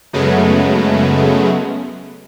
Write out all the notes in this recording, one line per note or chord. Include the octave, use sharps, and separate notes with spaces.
F#2 C#3 F#3 G#3 A3 B3